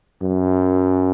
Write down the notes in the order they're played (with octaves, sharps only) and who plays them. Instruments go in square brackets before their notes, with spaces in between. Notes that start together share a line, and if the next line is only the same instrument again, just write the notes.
[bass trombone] F#2